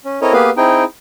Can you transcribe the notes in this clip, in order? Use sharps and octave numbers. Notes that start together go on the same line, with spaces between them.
C#4
C4 E4 A4 A#4 C#5 D#5
A#3 B3 G4 G#4 B4 F5
C4 D#4 E4 G#4 G5